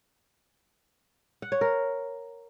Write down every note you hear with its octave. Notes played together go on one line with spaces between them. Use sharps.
F#5
C#5
A#4